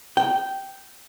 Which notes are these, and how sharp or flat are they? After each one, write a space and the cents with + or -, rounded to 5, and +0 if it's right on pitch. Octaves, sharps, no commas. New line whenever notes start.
G5 -10